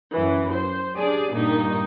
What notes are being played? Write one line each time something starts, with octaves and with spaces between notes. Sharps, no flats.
F#2 E3
C5
D4 G4 G#4 D5
G2 A#2 D#3 D#4